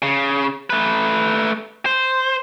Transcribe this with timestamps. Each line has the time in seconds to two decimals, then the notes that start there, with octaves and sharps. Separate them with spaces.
0.02 C#3
0.70 A3 B4
1.86 C5